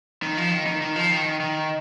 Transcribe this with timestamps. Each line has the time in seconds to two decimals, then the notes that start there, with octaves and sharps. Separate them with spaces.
0.22 D#3
0.37 F3
0.51 D#3
0.66 D#3
0.81 D#3
0.96 F3
1.10 D#3
1.24 D#3
1.40 D#3